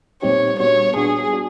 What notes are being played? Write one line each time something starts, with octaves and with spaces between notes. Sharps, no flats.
A#2 G3 C4 D#4 G4 C#5
A#2 G3 B3 D4 F#4 C#5
A#2 G3 B3 D4 F#4 G#4
D4 F#4